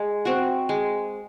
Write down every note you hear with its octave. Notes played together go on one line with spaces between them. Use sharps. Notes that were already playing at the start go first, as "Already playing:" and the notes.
Already playing: G#3
C4 F#4
G#3